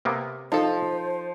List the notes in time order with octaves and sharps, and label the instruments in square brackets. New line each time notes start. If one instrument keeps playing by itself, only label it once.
[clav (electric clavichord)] C3 A#3 B3
[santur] F3 [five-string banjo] D#4 A4 [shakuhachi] C5